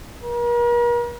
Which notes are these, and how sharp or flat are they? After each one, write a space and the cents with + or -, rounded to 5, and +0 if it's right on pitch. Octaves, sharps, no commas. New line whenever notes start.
A#4 +40